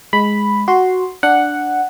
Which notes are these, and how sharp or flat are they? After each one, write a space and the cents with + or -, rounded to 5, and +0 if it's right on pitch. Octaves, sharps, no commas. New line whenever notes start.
G#3 +0 B5 +0
F#4 +0 C6 +0
D4 +0 F#5 +0